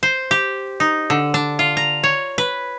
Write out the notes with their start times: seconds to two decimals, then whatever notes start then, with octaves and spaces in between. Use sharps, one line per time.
0.03 C5
0.31 G4
0.80 D#4
1.10 D3
1.34 D4
1.59 F4
1.77 A#5
2.03 C#5
2.38 B4